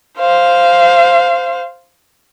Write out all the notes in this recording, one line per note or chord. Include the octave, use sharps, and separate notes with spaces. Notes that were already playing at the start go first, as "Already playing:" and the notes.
C5 F5